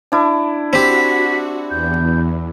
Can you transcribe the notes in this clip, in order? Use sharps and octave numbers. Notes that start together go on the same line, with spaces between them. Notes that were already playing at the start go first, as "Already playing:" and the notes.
D4 E4
C4 F#4 G4 B6
E2 G6